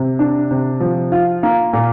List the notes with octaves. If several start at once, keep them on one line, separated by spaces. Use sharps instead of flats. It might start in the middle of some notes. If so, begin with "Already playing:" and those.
Already playing: C3
D4
C3
F3
F4
A#3
A#2